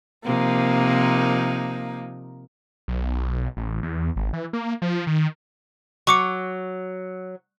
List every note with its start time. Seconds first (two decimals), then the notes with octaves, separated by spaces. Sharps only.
0.25 C3 F3 A#3 D#4
2.88 B1
3.57 A1
3.83 E2
4.16 G#1
4.33 E3
4.53 A#3
4.82 F3
5.07 D#3
6.07 F#3 C#6 D6 C#7